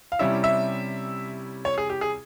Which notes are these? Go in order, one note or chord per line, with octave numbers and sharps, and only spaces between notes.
F5
C3 G3 C#4 E4 E5
E5
C#5
G#4
G4
G#4